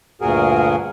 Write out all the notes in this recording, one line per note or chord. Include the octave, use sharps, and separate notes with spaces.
D2 G2 A#2 F#4 G#4 A#4